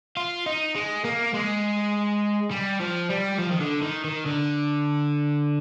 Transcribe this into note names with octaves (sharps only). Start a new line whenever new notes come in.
F4
D#4
G#3
A#3
G#3
G3
F3
G3
F3
D#3
D3
D#3
D#3
D3